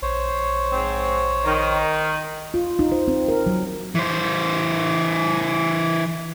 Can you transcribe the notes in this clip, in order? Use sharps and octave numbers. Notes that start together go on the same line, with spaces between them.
A#1 C5 C#5
G#2 C4
D#3
F4
D#4
C5
C4
A#4
F#3
E3 C5